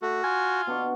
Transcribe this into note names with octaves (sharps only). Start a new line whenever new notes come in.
A3 F#4
F4 G#5
B2 D4 C#6